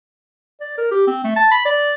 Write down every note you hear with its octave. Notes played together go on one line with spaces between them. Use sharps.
D5
A#4
G4
C4
A3
A5
B5
D5